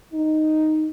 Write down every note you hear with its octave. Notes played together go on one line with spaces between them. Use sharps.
D#4